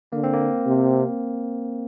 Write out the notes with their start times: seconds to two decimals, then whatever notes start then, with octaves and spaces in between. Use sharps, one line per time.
0.12 D3 A#3
0.24 C4
0.34 A#3
0.66 C3